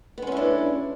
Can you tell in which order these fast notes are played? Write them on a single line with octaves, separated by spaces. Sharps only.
B3 G#3 C#4 E4 D4